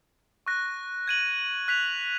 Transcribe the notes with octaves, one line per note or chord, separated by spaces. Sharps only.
C#6 F#6 A#6
G#6 D#7 F#7
F#6 B6 F7